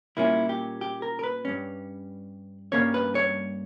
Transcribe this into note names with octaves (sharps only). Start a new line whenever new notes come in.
A#2 G3 A#3 C#4 E4
G4
G4
A#4
A#4
B4
G2 G3 C#4
G2 G3 A#3 C#4 C#5
B4
C#5